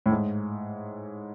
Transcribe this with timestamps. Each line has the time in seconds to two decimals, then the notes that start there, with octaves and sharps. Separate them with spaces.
0.06 A2
0.12 G#2